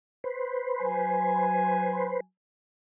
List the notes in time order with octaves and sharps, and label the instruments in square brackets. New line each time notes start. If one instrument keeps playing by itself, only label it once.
[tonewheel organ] B4 C5
[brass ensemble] F#3 G#5